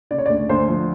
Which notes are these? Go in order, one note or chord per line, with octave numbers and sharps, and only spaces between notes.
C#3 D5
C#5
D5
D2
D2 C5
F3